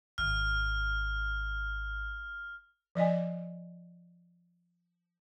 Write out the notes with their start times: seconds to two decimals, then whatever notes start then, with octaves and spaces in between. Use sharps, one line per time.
0.18 G#1 F6
2.95 F3 D5 D#5 G#5